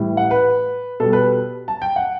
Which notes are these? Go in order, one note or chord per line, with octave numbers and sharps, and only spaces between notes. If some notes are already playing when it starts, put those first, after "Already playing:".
Already playing: A2 E3 G3
F#5
B4
B2 G3 A4
B4
A5
G5
F#5